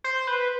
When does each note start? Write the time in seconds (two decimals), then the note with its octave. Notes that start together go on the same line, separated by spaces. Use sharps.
0.04 C5
0.27 B4